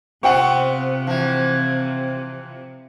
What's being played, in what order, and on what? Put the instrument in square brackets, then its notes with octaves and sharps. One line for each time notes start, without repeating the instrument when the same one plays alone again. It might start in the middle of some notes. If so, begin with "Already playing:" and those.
[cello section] C3 [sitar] B3 C4 F4 [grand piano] F#5 G5 C#6
[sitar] E3 F3